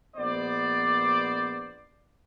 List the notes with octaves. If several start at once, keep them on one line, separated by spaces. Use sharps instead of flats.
A#1 B3 C5 D5